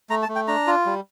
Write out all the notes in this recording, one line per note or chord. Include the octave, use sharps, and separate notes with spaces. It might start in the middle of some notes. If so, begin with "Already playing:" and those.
A3 A#5
A5
A3
G5
D4 A#5
F4
G3